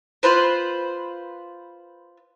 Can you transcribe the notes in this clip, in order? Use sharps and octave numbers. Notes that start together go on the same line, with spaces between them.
F4 B4 C5